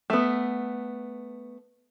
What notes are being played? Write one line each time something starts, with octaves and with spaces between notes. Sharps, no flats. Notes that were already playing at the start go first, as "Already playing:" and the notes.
A3 B3